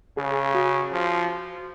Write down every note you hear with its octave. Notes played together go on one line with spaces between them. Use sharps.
C#3 G#4
F#4
F3